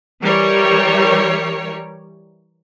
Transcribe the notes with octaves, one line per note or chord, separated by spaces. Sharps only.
E3 G3 A#4 C#5